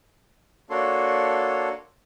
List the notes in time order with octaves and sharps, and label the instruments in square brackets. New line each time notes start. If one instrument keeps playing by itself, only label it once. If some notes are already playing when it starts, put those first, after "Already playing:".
[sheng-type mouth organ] A#3 D4 F#4 A4 C#5 C6